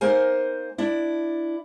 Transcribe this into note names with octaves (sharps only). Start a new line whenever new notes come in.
A#3 D#4 A#4 C5 G#5
D4 E4